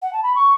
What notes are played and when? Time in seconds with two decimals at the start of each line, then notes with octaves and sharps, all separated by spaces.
0.02 F#5
0.13 A5
0.23 B5
0.35 C#6